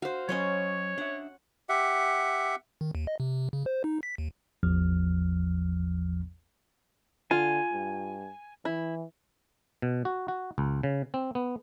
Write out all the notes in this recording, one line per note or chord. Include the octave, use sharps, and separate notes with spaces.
F#4 C5 F5
F#3 C#4 C#5 D#5 B5
D4 E5 F#5
G4 E5 F#5
D#3
D#2
D#5
C3
C#3
C5
D#4
B6
D#2
A1 E2 F3 F6
D3 F4 G#5
G2
E3 E4
B2
F#4
F#4
C#2
C#3
C4
B3